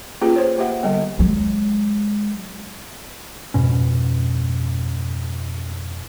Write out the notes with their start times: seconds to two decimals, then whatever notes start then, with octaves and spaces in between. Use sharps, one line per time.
0.21 A#3 C#4 F4 G4 G#4 B4
0.36 C5 C#5
0.58 A#3 G4 E5 F#5
0.83 D3 G3 B3
1.19 F#3 G#3
3.54 F2 G#2 B2 C#4